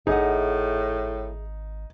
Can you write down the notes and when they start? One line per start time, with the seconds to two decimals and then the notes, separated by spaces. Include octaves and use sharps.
0.07 G#1 A2 D#4 G#4 E5 F#5